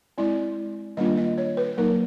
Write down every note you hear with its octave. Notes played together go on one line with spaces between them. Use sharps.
G#3 C4 E4 D5
D#3 G3 A#3 D4 F4 D#5
D#5
C#5
B4
F#3 A#3 D#4 A#4